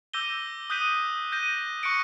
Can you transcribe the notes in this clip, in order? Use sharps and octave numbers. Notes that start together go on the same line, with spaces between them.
D6 E6 G6 A#6 D#7 G7
D#6 F#6 G6 B6 D#7 G7
G6 A#6 D#7
C#6 F#6 A#6 C#7 D7